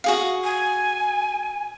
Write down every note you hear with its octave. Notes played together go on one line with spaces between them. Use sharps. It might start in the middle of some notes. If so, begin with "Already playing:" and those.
F#4 G#4 F5
G#5